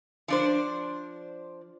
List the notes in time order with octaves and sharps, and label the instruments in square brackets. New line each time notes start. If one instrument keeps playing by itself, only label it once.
[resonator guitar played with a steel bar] F3 D4 C5